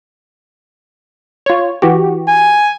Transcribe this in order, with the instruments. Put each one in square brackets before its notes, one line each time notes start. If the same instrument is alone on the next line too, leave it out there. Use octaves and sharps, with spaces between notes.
[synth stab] F4 C#5
E3 F#4 G4
[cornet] G#5